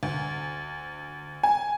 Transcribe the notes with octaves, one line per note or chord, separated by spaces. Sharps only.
D2
G#5